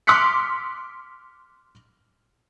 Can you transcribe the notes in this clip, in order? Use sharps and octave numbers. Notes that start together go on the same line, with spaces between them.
C6 D6 F6 F#6 B6 C#7